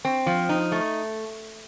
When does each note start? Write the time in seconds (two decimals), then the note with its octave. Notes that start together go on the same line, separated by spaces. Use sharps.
0.05 C4
0.26 F3
0.49 D#4
0.72 A3